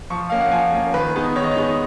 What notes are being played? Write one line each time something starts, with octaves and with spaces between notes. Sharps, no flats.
F3 C#6
A#3 C#4 F5
F#5
F3 G#5
A#3 C#4
D#3 B4
G#3 B3 D#4
D#3 C#5
D#5
C#5
G#3 B3 D#4